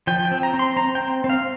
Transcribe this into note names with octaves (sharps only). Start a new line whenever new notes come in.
F3 G5
G5
C4
A#5
C4
C6
C4 A#5
C4 G5
C4
F5